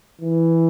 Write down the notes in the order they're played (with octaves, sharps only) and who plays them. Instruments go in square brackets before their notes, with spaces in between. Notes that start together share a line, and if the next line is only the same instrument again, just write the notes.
[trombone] E3